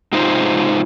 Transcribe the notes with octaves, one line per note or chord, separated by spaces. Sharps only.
G#2 C3 D#4 F4 C5